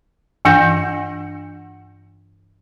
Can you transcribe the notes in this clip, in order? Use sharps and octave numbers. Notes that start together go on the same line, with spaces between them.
G2 E3 D4 F#5 G6 A#6